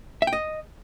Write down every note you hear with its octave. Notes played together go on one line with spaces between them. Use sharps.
E5
G5
D#5